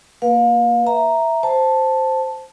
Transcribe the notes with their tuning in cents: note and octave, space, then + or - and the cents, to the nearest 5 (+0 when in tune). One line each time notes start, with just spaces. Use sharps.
A#3 +0 B4 -35 F5 +30
E5 +0 A#5 +0
C5 +0 A5 +0